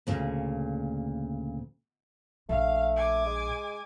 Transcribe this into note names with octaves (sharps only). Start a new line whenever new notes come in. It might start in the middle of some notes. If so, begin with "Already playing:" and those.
D2 A#2 C#3
A#1 A3 F5
G#5 D6
G#3